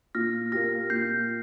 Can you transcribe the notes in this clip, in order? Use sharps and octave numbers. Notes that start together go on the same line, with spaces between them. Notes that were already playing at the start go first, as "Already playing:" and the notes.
A#2 F6 A#6
A#3 G4 F6 A#6
A#2 G6 C7